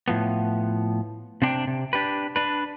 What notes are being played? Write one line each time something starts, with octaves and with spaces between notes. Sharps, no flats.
A2 F3 B3
C3 C4 D4 G5
C3
D4 G4 B4
D4 B4